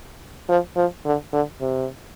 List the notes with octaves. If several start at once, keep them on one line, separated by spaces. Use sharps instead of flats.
F3
F3
D3
D3
C3